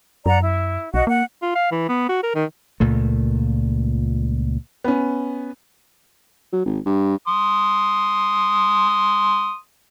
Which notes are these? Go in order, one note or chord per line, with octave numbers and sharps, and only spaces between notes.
F#2 D5 F#5 A#5
E4
B1 F#4 D#5 F#5
A#3 F#5
F4
F5
E3
B3
F#4
A#4
D#3
C#2 A#2 A3
B3 C#4
F#3
G#1
G2
C6 D#6